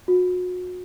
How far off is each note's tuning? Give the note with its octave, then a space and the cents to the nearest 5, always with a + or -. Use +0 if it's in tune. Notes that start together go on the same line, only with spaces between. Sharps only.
F#4 -35